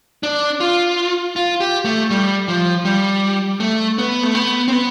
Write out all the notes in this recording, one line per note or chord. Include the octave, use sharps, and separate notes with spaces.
D4
F4
F4
G4
A3
G3
F3
G3
A3
B3
A3
B3
C4
B3